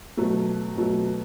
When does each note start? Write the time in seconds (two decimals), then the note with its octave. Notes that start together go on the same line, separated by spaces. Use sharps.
0.17 B2 F#3 A3
0.76 B2 F#3 A3